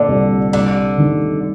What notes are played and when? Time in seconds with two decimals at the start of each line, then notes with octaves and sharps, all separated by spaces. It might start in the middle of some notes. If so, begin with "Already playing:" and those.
Already playing: A#2 D3
0.08 C2
0.53 C2 D3
0.98 D#3